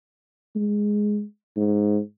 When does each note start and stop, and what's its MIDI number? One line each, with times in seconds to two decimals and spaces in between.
0.56 1.23 56
1.57 1.99 44